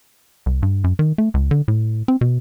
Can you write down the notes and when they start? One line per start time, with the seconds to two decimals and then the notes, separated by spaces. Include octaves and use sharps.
0.46 C2
0.63 G2
0.84 F#2
0.99 D#3
1.18 A3
1.34 C#2
1.51 D3
1.68 A2
2.08 C4
2.21 B2